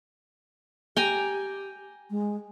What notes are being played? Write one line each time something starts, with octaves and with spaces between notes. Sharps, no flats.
G4 G5 G#5 A#5
G#3